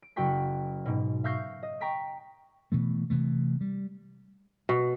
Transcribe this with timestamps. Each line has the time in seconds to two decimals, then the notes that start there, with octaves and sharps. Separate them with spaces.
0.02 D7
0.16 F#1 F#4 G5 C#6 B6
0.86 G#2 B2
1.24 E5 F5 C#6 G6 A#6 C7
1.63 D#5
1.81 G5 A#5 C#6 B6 D7
2.72 B2 E3 A3
3.10 C3 E3 A3
3.61 G3
4.69 B2